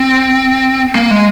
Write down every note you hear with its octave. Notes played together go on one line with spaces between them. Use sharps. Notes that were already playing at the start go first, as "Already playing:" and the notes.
Already playing: C4
A#3
G#3